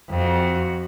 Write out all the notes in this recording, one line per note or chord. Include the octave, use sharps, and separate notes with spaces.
F2 F#4